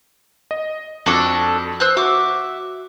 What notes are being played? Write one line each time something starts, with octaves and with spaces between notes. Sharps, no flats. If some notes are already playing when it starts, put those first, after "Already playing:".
D#5
F2 D4 F#4 A4 D6
C5 E6 F#6
F#4 E5 D6